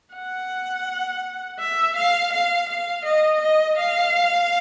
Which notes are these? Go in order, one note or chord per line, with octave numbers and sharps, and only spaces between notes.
F#5
E5
F5
F5
F5
D#5
D#5
F5